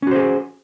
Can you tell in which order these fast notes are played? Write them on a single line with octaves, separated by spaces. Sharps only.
C#4 F#4 C5 G#4